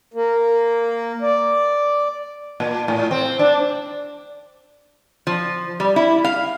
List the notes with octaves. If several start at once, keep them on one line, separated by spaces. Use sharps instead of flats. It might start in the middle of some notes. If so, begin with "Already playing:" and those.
A#3
D5
A#2
A2
C4
D4
F3
G3
E4
F5